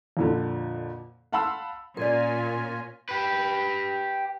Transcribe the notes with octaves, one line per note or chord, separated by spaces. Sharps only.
F2 A#2 D3
F5 F#5 A5 B5 C6 E6
A#2 C#4 F4 A#4 D5 G#5
G4 B4